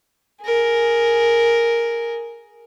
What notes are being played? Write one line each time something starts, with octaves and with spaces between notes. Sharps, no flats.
G#4 A#4